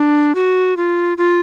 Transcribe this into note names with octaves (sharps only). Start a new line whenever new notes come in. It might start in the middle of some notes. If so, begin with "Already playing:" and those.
Already playing: D4
F#4
F4
F4